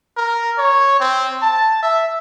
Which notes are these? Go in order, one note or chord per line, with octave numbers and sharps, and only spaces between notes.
A#4
C#5
C4
A5
E5